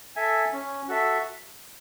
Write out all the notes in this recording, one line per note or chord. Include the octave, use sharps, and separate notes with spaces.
A4 E5 G#5
C#4
F#4 A4 E5